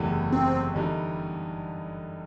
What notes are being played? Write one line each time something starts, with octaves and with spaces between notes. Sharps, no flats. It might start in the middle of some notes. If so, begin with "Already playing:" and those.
Already playing: F#1 E2 C3 E3 A3
C4
G1 G2 E3 G3 D#4